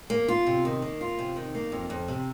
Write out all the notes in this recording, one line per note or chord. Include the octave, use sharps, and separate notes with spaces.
A#3
F4
C3
D#3
A#3
F4
C3
D#3
A#3
F2
F2
C3